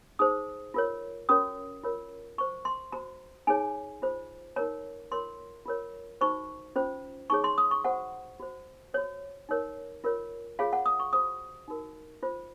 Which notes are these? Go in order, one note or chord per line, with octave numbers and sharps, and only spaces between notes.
D#4 G#4 C5 D#6
F4 A#4 C#5
C#4 F#4 A#4 C#5 D#6
F4 A#4 C#5
F#4 C5 C#6
C6
F#4 C5 A#5
D#4 G#4 C#5 G#5
F4 C5
D#4 A#4 C#5 A#5
F4 A#4 C#5 C6
F4 A#4 C#5
D#4 F#4 C5 C#6
C#4 F4 C5
D#4 G#4 C#5 C#6
C6
D#6
C#6
F#4 C5 F#5
F#4 C5
F#4 C5 C#5
D#4 A#4 C#5
F4 A#4 C#5
F4 G#4 C#5 F5
F#5
D#6
C#6
F#4 C5 D#6
D#4 F#4 A#4
F4 C5